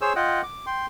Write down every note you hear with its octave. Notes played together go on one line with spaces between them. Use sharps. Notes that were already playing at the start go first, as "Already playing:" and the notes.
G#4 C5 C#5 E6
F4 D#5 F#5 G5
D6
G5 C6